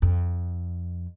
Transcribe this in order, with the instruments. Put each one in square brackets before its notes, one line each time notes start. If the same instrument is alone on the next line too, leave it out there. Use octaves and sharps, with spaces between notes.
[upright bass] F2